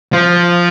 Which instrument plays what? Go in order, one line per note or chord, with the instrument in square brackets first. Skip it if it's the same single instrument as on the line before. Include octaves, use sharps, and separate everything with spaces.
[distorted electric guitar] F3